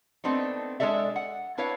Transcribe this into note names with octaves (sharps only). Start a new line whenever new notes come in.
A3 B3 C4 D4 D#4
G#3 D4 A4 D5 E5
F#5
D4 E4 B4 C#5 F5